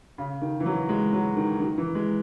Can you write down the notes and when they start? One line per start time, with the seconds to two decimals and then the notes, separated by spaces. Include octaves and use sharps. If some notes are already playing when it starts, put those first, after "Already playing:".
0.18 C#3
0.42 D#3
0.60 E3
0.66 F#3
0.89 G#3
1.13 F#3
1.36 D#3
1.60 D#3
1.78 E3
1.95 G#3